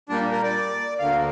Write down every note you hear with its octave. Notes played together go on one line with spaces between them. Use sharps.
A#2 G3 A#3 D4
A#4
D5
D2 D3 A#3 F5